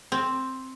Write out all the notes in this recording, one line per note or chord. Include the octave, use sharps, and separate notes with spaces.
C4